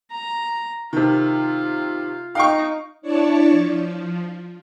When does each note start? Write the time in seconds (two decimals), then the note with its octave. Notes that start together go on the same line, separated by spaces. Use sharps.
0.11 A#5
0.93 C3 D#3 F4
2.35 D#4 F5 G5 C#6
3.02 D4 E4 C#5 D5 A5 C#6
3.51 F3